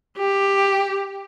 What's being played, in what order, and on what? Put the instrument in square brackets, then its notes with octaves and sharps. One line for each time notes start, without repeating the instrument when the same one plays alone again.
[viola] G4